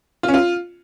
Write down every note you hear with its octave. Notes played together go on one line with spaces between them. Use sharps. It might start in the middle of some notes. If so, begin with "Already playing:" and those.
F4
C#4
F4